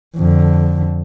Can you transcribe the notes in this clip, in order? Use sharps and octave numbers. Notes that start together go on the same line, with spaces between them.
F2 D3